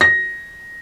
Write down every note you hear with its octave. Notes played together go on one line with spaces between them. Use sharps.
A#6